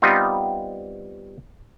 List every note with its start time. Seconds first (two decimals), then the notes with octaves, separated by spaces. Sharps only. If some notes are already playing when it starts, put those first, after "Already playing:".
0.02 G3 B3 C4 D#4 F4